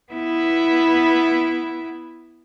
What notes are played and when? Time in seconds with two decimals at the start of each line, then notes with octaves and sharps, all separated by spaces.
0.12 B3 E4